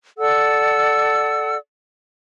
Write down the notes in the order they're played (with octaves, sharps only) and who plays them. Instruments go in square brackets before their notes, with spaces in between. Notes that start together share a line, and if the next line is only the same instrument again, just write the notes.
[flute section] A4 D5 F#5 E6